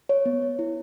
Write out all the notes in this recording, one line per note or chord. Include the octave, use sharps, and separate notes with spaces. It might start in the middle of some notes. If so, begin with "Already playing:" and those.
C#5
B3
B3
E4